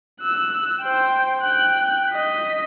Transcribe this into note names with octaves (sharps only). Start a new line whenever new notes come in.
E6 F#6
C5 G5
G5 F#6
D#5 B6